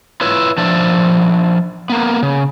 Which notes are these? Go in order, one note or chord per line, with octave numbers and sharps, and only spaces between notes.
E4 F4 B4 C#5 E5
F3 D4 D5 E5
A#3 B3
C#3